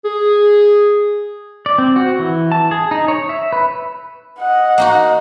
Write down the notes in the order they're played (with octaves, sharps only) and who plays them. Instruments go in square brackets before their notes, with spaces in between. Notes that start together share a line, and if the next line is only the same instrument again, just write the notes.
[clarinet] G#4
[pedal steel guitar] D5
C4
F#4
E3
A5
G#4
D#4
C#5
E5
B4
[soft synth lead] D#5 [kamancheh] F#5
[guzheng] A#3 D#4 F#4